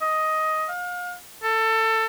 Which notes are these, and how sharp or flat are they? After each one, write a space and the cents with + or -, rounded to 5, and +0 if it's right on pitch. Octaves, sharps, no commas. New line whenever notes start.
D#5 +10
F5 +35
A4 +20